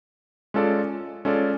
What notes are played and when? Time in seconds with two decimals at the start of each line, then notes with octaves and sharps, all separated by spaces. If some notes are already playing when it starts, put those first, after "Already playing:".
0.54 G#3 C#4 F4 A4 D5
1.25 G#3 C#4 F4 A4 D5